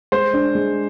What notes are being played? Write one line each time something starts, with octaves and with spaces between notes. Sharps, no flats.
G#3 C5
D4
G#3